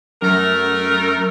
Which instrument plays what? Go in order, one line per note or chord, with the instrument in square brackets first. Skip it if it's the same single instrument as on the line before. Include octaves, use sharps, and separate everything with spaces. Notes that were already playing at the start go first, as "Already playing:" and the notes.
[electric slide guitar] F#2 [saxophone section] A3 A#4